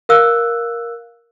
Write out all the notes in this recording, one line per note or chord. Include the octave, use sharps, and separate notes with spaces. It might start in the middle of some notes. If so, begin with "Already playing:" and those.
A#4 F5 E6 F#6